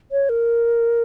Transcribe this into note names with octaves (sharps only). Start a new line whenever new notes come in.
C#5
A#4